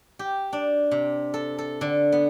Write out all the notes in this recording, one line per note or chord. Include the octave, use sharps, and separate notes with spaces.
G4
D4
C3
A4
A4
D3
B3